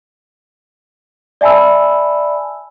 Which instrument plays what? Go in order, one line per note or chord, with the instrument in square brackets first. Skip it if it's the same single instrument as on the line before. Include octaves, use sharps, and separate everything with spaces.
[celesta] D5 E5 G#5 A5 B5 E6